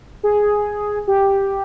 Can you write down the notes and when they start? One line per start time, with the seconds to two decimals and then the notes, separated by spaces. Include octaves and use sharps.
0.23 G#4
1.07 G4